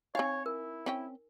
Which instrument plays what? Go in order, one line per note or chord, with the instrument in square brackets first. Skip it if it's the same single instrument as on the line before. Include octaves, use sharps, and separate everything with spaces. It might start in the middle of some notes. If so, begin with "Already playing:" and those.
[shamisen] C4 F5 [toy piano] D#4 G#5 [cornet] C#5
[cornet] E4 [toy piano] A#4
[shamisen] C4 C#4 G5